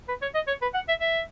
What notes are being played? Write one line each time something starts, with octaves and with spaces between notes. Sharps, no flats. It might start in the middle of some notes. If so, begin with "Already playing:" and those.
B4
C#5
D#5
C#5
B4
F#5
E5
E5